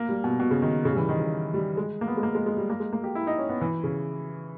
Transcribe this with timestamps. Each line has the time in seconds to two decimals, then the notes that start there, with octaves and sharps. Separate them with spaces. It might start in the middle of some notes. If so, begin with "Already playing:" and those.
Already playing: A#3
0.09 G3
0.24 B2
0.40 B2
0.51 C#3
0.62 D#3
0.85 C#3
0.92 G3
0.97 E3
1.09 D#3
1.19 C#3
1.54 G3
1.77 G#3
2.01 A#3
2.08 B3
2.17 G#3
2.23 A#3
2.35 G#3
2.46 G#3
2.57 G3
2.70 A#3
2.80 G#3
2.93 A#3
3.04 G4
3.15 E4
3.27 D#4
3.38 C#4
3.49 B3
3.61 E3
3.84 C#3